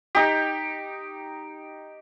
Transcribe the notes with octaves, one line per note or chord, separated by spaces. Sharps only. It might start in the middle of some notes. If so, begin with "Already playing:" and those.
D#4 G4